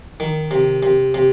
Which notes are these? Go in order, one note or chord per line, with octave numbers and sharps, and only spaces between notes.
D#3
C3
C3
C3